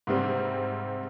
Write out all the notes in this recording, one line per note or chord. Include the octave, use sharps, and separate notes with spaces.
G#2 C3 G3 C4